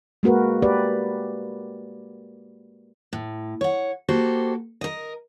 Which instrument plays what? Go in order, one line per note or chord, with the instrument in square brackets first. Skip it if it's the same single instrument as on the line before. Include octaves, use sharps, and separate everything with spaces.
[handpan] G#3 A#3 F#4 A#4 B4
G4 B4 D5
[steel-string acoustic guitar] A2
C#5 F#5
A#3 F#4 G4 A4 C5
A#4 D#5